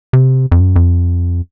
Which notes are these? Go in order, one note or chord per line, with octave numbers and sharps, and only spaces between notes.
C3
F2
F#2
F2